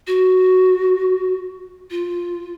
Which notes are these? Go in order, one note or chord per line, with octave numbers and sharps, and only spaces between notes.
F#4
F4